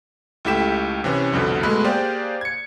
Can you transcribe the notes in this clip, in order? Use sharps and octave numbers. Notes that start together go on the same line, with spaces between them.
C#2 A3 E4 G4 B6 E7
C3 E3 C#4
C2 F2 B2 D3
B2 G#3 A3 B3 B5 F#6
A#3 G4 G#4 C5 D5 F5
G#6 C#7